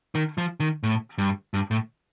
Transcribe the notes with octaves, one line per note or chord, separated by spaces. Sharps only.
D#3
F3
D#3
A2
G2
G2
A2